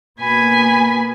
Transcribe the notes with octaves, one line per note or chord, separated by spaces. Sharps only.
B2 A#3 G#5 B5